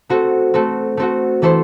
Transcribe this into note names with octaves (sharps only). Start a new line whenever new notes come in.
A3 C4 F#4 A4
A3 C4 F#4 A4
A3 C4 F#4 A4
E3 A3 E4 A4 C5